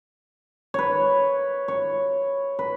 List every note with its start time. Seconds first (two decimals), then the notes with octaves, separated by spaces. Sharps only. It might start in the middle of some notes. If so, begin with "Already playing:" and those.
0.74 B4 C#5
1.68 C#5
2.59 B4